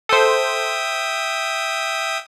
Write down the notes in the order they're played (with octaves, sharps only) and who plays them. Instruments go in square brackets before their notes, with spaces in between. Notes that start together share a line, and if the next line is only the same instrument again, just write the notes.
[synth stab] A4 C5 [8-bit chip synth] E5 G5 D#6